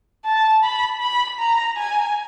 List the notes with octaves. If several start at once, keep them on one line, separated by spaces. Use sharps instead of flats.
A5
B5
B5
A#5
G#5